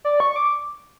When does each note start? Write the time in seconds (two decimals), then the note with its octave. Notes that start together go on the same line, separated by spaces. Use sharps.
0.05 D5
0.20 C#6
0.36 D6